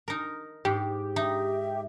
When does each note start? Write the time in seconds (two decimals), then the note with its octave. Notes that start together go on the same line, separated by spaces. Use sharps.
0.08 D#4 A#4
0.65 G#2 G4
1.16 D#4 E5